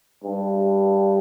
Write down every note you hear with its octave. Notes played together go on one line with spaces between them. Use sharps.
G2